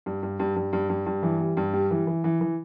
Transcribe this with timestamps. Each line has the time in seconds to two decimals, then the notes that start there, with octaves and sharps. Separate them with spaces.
0.06 G2
0.23 G2
0.40 G2
0.56 G2
0.73 G2
0.90 G2
1.06 G2
1.23 E3
1.40 G3
1.57 G2
1.73 G3
1.91 E3
2.07 E3
2.24 E3
2.41 E3